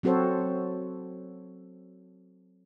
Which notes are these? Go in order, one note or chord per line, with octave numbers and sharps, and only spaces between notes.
F#3 C4 F#4 A4 C5 C#5